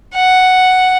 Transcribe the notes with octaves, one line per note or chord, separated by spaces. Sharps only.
F#5